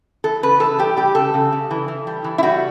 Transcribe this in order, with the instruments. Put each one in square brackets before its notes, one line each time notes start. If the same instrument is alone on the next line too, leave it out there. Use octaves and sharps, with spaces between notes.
[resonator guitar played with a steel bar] E3 A4
C#3 B4
E3 A4
G3 G4
G3 G4
C#3 A4
C#3
C#3
E3
E3
G3
E3
E4
G3 F#4